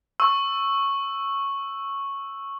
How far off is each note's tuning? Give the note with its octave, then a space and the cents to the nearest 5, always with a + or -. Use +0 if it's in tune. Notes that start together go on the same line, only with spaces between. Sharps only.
C#6 -5 E6 +0